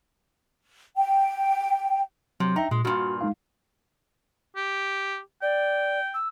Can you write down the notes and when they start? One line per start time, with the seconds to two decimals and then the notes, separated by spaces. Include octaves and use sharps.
0.96 G5
2.40 C3 F#3
2.56 D#4 E5 G5 A#5
2.71 A#2 G#3
2.85 G2 A#2 F#4
3.21 G#3 D#4 F5
4.56 G4
5.42 D5 G5
6.14 E6